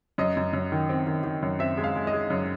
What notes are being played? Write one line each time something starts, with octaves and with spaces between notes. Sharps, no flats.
F#2 D#5
F#2
F#2
D#3
C4
D#3
D#3
F#2
C4 E5
G#3
F5
G#3
D#5
G#3
F#2